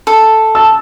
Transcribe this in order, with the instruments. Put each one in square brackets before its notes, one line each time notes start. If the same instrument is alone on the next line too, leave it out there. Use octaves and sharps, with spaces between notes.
[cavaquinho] A4
[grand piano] A5 E6